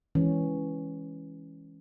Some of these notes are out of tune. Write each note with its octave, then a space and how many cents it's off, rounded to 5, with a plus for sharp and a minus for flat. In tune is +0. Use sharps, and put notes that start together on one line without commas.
E3 +0 G#3 +0 C#4 +0